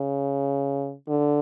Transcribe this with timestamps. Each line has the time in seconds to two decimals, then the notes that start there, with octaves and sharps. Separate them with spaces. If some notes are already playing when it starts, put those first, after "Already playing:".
Already playing: C#3
1.08 D3